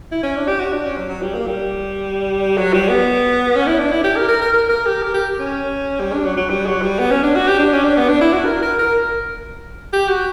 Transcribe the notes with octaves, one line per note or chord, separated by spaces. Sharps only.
E4
C#4
D4
G4
F#4
D4
C#4
F#3
F#3
G3
A#3
G3
F#3
G3
B3
C#4
E4
D4
E4
G4
A#4
A#4
A#4
A#4
A#4
G4
A#4
G4
C#4
G3
D4
F#3
F#3
G3
F#3
G3
B3
C#4
D4
F#4
G4
D4
C#4
D4
B3
D4
E4
F#4
A#4
A#4
A#4
G4
F#4